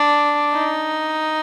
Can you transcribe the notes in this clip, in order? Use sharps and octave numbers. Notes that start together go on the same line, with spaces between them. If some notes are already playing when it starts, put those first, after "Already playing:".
Already playing: D4
D#4